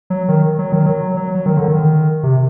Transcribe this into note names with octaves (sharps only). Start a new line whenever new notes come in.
F#3
D#3
F#3
D#3
F#3
F#3
F#3
D#3
D3
D#3
C3